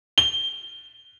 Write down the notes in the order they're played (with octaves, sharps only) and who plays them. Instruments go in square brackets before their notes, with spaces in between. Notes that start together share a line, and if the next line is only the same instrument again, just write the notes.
[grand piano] G7